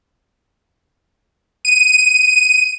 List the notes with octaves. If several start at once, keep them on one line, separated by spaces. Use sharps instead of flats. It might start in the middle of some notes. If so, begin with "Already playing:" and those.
D#7